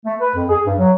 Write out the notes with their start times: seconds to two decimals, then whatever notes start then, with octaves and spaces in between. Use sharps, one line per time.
0.05 A3
0.20 B4
0.35 F2
0.49 G#4
0.66 G2
0.78 F#3